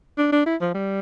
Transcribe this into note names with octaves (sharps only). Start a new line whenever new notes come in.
D4
D4
E4
F3
G3